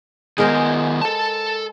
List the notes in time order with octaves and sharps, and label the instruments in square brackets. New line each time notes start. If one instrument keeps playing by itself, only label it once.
[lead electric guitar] D#3 B3 [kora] G#3 A#4 C5
[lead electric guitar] A4 A5